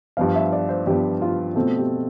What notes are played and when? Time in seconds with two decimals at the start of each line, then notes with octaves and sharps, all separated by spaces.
0.17 G2 F3 B3 F5
0.35 E5
0.53 D5
0.69 C5
0.87 G2 F3 B3 G4
1.22 F4
1.55 B2 A3 C4 F4
1.78 G4